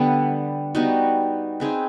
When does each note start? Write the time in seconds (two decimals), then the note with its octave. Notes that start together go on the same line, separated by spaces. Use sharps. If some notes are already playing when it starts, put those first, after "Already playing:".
Already playing: D3 G3 B3
0.75 G3 B3 D#4 F#4
1.60 C4 D#4 G#4 B4